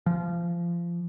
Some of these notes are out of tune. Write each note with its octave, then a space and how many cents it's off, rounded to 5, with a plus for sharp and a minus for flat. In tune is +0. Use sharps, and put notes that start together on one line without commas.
F3 -25